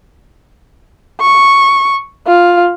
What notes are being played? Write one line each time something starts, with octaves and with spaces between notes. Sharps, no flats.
C#6
F4